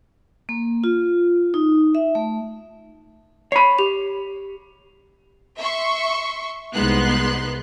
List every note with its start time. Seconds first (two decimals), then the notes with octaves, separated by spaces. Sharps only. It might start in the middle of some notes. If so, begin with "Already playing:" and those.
0.49 A#3
0.84 F4
1.54 D#4
1.95 E5
2.15 A3
3.52 C#5 B5 C7
3.79 G4 F7
5.58 E5 C6 C#6
6.74 C2 G#3 B3 D#4 C6 F#6